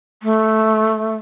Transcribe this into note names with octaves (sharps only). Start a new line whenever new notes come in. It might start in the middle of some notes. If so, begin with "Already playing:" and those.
A3